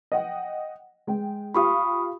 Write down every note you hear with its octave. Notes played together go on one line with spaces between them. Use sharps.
D#5 F#5 G5
G#3 G5
F4 G4 F5 B5 C#6 D#6